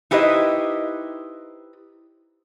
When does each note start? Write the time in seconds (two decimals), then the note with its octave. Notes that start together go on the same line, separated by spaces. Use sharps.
0.11 D#4 E4 G4 B4 C5 D#5